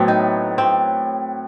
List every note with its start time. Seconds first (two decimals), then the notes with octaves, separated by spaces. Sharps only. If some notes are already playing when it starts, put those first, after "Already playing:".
Already playing: A2 F#3 A3 B3 C4
0.08 D#4
0.58 C4